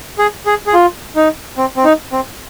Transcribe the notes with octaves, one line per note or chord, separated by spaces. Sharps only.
G#4
G#4
G#4
F4
D#4
C4
C4
D#4
C4